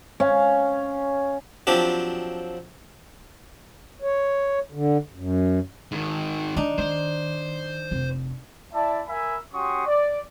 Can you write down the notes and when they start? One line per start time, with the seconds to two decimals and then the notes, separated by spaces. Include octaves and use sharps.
0.20 C#4 F5
1.67 F3 F#3 C4 D4 G4
4.02 C#5
4.72 D3
5.14 F#2
5.92 G#2 D#3
6.57 D#3 D4 D#4
6.78 D#3 C5
7.91 F1 C4
8.72 E4 D5 E5 A5
9.07 A#4 E5 G#5 B5
9.53 C#4 F#4 G4 C6 C#6 D#6
9.86 D5